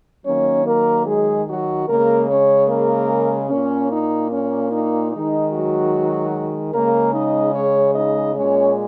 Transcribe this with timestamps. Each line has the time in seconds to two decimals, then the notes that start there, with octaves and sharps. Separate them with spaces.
0.25 D#3 F#3 A#3 C#4 C#5
0.65 A#3 A#4
1.06 G#3 G#4
1.46 F#3 F#4
1.87 C#3 G#3 A#3 A#4
2.28 C#4 C#5
2.68 A#3 A#4
3.49 A#2 A#3 C#4
3.90 D#4
4.31 C#4
4.70 D#4
5.11 D#3 G#3 D#4
5.51 F#3 F#4
6.72 C#3 G#3 A#3 A#4
7.13 D#4 D#5
7.54 C#4 C#5
7.94 D#4 D#5
8.35 A#2 G#3 C#4 C#5